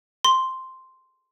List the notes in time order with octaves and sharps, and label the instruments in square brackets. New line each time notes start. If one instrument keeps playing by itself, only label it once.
[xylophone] C6